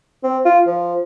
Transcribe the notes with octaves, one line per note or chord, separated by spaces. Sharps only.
C4
F4
F3